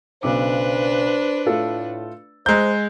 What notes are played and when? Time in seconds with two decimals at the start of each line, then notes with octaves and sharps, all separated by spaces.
0.23 B1 C#3 D4 B4 C5 D6
1.47 A2 A3 F4 A4
2.46 G#3 C5 A#5 E6 F#6 G6